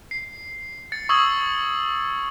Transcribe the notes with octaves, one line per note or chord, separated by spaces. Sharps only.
C7
A6 C#7
C#6 D#6 E6 G#6 F#7